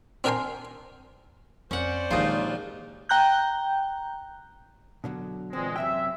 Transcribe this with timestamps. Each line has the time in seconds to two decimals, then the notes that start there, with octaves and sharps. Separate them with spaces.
0.24 C4 D4 A#4 G5 G#5 C6
1.71 F2 C#4 C5 D5 F#5
2.11 A#1 D#2 A#2 D#3 G#3 D#4 F4
3.09 G5 A#5 F#6 G6
5.04 B2 D3 F#3
5.53 A#2 E3 G#3 C4
5.76 F#2 C3 E5 G5